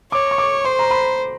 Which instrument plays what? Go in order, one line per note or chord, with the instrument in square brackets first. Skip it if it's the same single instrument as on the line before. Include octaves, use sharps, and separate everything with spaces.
[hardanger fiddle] C#5 [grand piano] D6
[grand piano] C#6
D6
[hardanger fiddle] C5 [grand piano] C6
[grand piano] A#5
B5